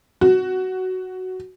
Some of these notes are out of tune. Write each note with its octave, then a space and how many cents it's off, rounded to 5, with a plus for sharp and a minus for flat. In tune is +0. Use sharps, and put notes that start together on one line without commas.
F#4 +5